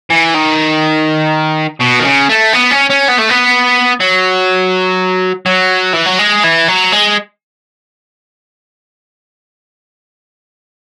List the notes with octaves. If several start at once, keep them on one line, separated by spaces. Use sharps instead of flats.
E3
D#3
B2
D#3
C#3
A3
B3
C#4
C#4
B3
A3
B3
F#3
F#3
E3
F#3
G#3
E3
F#3
G#3